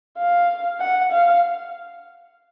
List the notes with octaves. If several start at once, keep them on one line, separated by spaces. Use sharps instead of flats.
F5
F#5
F5